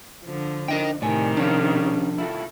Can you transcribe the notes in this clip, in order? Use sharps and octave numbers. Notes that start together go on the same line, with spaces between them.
D3 F3
D4 D#4 A#4 D#5 G5
A2 C3 D#3 G3 D5 G#5
F3 C#4 D4 C#5 F5
E4 F4 A4